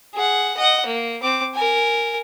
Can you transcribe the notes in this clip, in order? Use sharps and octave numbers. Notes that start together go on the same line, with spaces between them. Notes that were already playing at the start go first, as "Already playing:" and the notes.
G#4 F#5
D#5 F#5
A#3
C4 D6
A#4 G#5